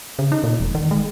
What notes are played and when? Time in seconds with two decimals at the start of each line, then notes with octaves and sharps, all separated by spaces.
0.19 C#3
0.32 D#4
0.44 A#2
0.60 E1
0.75 D#3
0.91 G#3